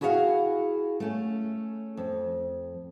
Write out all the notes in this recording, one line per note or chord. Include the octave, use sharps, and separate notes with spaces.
E4 F#4 G#4 D#5 F5 F#5
A3 C#4
F2